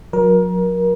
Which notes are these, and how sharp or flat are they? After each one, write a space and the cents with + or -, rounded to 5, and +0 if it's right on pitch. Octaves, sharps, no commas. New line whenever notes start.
F#3 -30 A#4 +25